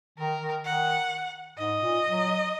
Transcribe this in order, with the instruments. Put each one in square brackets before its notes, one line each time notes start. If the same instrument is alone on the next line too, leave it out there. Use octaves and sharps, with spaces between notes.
[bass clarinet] D#3 [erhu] A#4
[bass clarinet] D#3
[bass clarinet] D#3 [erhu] F#5
[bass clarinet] G#2 [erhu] D#5
[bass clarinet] A#2
F#3